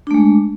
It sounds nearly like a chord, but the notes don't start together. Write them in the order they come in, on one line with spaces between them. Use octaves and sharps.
D4 A3 G#3